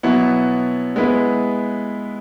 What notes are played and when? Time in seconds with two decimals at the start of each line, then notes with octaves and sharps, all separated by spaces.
0.03 B2 F#3 B3 E4
0.96 G#3 B3 E4 B4